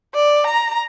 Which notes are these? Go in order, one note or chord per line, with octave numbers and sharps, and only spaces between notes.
D5
A#5